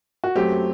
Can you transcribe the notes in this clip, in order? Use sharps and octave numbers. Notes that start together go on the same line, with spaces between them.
F#4
F#2 F#3 A3 C4 G4